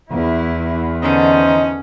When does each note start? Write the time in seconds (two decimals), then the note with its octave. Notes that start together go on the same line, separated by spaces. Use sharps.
0.11 E2 E4
1.03 D3 E3 C#4 D#4 C5 D#5